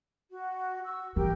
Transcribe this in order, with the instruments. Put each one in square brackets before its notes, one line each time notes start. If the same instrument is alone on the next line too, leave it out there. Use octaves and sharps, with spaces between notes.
[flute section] F#4
C#6 E6
[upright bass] E3 [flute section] G4 A#4 G5